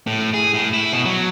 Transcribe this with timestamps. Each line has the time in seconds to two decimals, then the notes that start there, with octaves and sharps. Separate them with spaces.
0.07 A2
0.34 G#4
0.54 A2
0.74 E4
0.93 B2
1.05 F#3